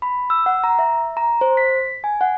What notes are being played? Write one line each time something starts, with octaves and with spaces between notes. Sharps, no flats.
B5
E6
F#5
A#5
E5
A#5
C5
B6
G#5
F#5